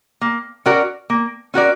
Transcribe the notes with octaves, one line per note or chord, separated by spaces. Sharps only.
A#3
C#4 F#4 A#4 D5
A#3
C#4 F#4 A#4 D5